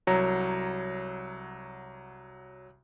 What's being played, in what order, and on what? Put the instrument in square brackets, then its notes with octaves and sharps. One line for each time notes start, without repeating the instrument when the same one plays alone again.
[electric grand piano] C2 F#3 C#5 A#5